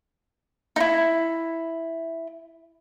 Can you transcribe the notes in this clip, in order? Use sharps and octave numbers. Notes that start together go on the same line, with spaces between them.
D#4 E4